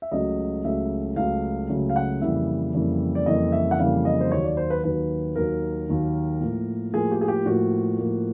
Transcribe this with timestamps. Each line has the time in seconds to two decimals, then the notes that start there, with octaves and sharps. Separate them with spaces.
0.02 E5
0.11 C#2 C#3 F#3 A3 D#5
0.64 C#2 C#3 F#3 A3 E5
1.16 C#2 C#3 F#3 A3 F5
1.69 C#2 C#3 F#3 A3
1.89 F5
1.96 F#5
2.22 F2 C#3 E3 G3 A#3 E5
2.74 F2 C#3 E3 G3 A#3
3.15 D5
3.26 F2 C#3 E3 G3 A#3 D#5
3.52 E5
3.71 F#5
3.78 F2 C#3 E3 G3 A#3 F5
4.05 D#5
4.21 C5
4.31 D#2 D#3 F#3 C#5
4.44 D5
4.57 C5
4.70 B4
4.84 D#2 D#3 F#3 B4
5.36 D#2 D#3 F#3 A#4
5.89 D#2 D#3 F#3
6.41 A2 F3 A#3
6.93 A2 F3 A#3 G#4
7.11 G4
7.21 G#4
7.28 G4
7.46 A2 F3 A#3 F#4
7.98 A2 F3 A#3